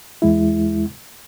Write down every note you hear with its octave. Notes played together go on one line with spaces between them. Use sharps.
E2 G#3 E4